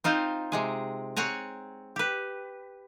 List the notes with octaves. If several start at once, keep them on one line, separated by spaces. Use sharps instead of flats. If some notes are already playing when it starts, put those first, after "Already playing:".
C4 D#4 F4 C5
C3 G#3 G#4
C4 C#5 F#5 G#5 A#5
G4 B4